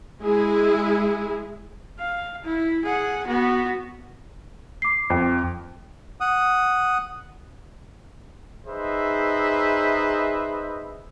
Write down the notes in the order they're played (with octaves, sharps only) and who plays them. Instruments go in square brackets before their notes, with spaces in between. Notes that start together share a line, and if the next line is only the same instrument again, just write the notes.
[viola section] G#3 E4 G#4
[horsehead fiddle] F5
E4
G#4 F#5
B3 F#4
[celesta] D6 C7
[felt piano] F2
[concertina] F#5 D#6
[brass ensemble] D#4 G#4 B4 C5 D#5 E5